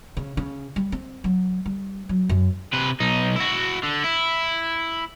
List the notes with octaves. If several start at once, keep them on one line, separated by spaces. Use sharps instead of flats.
C#3
C#3
G3
C4
F#3
G3
F#3
F#2
C3 B4
B1 D#4
E4 F#4
D3
E4